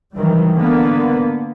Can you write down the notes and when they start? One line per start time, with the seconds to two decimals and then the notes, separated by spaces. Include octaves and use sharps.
0.13 D#3 E3 F#3 G3
0.54 D3 A#3 B3